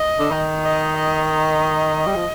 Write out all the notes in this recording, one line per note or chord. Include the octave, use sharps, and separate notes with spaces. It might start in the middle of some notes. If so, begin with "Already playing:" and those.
Already playing: D#5
D3
D#3
D#5
D#5
D#5
G3
F3